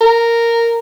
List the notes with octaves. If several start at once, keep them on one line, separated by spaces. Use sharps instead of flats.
A#4